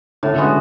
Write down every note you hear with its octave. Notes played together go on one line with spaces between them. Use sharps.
A2 D3
D3
C#3 G#3 B3 F#4